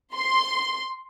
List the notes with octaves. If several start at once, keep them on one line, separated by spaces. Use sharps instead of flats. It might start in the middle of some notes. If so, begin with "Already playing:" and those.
C6